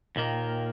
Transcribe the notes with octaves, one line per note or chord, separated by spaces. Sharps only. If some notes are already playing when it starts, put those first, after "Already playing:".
D#2 A#2 D#3 A#3